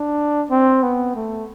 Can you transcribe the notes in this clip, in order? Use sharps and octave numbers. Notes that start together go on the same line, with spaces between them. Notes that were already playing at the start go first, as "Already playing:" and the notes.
Already playing: D4
C4
B3
A3